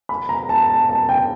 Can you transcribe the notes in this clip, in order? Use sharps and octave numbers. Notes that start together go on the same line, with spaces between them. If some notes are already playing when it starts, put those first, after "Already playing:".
B5
A#5
A5
A5
A5
G5